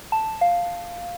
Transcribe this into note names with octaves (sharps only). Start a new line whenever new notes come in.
A5
F5